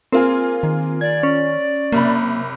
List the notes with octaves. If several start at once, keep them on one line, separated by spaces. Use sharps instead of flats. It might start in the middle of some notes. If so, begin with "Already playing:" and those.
A#3 C4 F4 G#4
D#3
D5 G#6
C#4
F#1 C3 A#3 B5